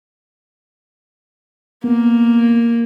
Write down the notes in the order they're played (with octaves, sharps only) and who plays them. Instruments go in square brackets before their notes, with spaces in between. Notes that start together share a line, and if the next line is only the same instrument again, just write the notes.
[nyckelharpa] A#3 [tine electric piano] B3